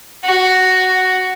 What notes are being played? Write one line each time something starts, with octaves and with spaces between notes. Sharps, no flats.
F#4